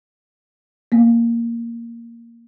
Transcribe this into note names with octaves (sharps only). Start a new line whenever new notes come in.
A#3 B3